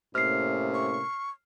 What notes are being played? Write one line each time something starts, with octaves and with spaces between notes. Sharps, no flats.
A2 C3 A#3 C#4 F6 C7
C#6